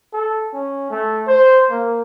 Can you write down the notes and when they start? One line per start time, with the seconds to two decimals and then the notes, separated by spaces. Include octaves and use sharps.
0.13 A4
0.54 C#4
0.91 A3
1.28 C5
1.70 A#3